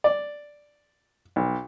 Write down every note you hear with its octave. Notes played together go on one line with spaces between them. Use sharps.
D5
B1